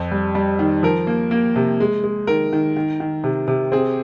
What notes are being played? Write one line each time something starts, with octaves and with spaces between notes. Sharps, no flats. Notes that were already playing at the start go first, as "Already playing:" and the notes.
Already playing: F2
G3
G3
D#3
F3 A#4
A#3
A#3
C3
G#3
G#3
D#3 A#4
D#3
D#3
D#3
C3
C3
C4 G#4